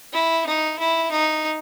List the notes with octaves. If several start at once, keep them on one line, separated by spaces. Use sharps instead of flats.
E4
D#4
E4
D#4